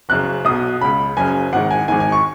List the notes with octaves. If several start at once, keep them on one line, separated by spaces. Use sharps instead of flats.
F#1 F#2 C#3 F#6
B1 B2 D#6
C#2 C#3 B5
F#1 F#2 C#3 G#5
G#1 G#2 D#3 F#5
G#5
G#1 G#2 D#3 G#5
G#5
C#6